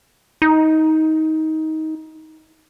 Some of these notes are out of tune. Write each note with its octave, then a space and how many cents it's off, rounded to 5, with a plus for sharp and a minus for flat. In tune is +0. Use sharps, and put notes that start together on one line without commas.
D#4 +20